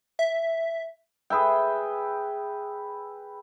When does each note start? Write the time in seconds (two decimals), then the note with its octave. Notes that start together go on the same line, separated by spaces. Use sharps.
0.19 E5
1.30 G#4 B4 E5 G5